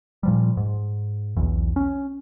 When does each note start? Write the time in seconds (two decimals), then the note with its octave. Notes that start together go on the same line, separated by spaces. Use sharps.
0.23 A#2 F3 G3
0.57 G#2
1.37 B1 E2
1.76 C#4